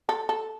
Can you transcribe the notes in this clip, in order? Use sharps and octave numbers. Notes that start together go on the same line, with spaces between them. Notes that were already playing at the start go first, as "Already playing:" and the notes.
A4
A4